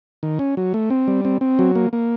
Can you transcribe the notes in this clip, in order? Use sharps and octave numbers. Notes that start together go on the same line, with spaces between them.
D#3
C#4
F#3
A3
C4
G3
C4
C4
F#3
A#3
A#3